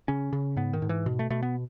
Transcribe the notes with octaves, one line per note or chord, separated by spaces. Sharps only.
C#3 C#4
C#3
G#2 B3
D#3
G#2
E3
B2
A3
B2 A3
B3